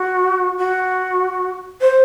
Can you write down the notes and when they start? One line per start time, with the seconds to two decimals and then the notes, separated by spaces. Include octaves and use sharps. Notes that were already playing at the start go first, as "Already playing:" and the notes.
Already playing: F#4
0.59 F#4
1.81 C5